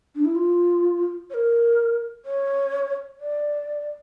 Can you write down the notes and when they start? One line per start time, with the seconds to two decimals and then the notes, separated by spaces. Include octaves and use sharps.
0.15 D4
0.25 E4
0.35 F4
1.30 C#5
1.34 A#4
2.25 C#5
3.20 D5